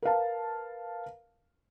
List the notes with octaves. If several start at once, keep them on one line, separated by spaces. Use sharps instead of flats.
A#4 B4 F5 A5